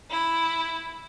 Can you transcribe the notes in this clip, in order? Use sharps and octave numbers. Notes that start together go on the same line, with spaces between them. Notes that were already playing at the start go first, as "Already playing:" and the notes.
E4